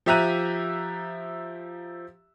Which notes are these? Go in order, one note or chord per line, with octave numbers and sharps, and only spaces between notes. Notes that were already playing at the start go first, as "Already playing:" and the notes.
F3 G4 E5 A#5 F#6 D#7